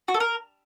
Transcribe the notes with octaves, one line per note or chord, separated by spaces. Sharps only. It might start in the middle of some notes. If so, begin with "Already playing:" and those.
F#4
A4
A#4